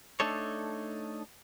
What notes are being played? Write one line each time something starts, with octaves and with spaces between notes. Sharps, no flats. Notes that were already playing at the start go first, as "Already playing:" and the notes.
A3 D4 D#4 A4 C#5